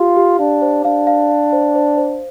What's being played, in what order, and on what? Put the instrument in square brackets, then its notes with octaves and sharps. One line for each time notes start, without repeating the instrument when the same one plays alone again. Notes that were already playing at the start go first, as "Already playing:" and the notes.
Already playing: [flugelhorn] F4 [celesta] G4 F5
[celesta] G4
[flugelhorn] D4 [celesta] F5
[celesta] C5
[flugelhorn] D4 [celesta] F5
[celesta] F5
F5
C5
C5
C5